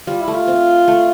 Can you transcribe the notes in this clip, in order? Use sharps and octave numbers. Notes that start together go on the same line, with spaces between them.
G3 F4
E4
A3
F4
C4
A3